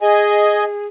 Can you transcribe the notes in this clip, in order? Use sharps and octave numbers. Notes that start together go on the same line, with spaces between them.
G#4 D#5 G#5